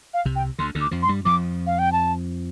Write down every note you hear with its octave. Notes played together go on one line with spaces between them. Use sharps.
F5
C2 C3
G5
D2 D3 C6
D2 D3
D6
F2 F3
C6
G2 G3
F2 F3 D6
F5
G5
A5